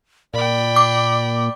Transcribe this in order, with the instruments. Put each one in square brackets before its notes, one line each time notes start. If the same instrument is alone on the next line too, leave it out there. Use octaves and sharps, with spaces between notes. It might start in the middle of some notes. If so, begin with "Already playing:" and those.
[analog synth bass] A#2 [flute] D5 [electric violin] G5 B5
[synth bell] D6